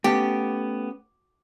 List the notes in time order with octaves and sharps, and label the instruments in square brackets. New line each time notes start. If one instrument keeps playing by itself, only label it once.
[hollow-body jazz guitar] A3 B3 C#4 [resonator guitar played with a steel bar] G4